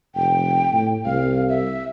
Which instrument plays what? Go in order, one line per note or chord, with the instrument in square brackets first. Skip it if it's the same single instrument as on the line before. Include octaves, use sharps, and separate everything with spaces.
[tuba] F1 [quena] G5
[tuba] A2
[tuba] C2 [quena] F5
[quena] E5